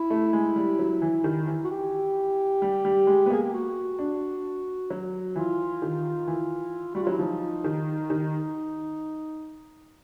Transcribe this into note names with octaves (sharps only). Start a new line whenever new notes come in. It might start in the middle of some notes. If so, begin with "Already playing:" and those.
Already playing: E4
A3
G#3
G3
F#3
E3
D#3
E3
F#4
G4
G3
G3
G#3
B3
A#3 G#4
G4
F#4
D4
F#3
E3 F4
D#3
E3
G3 F#4
F4
F#3 E4
F3 D#4
D#3
D#3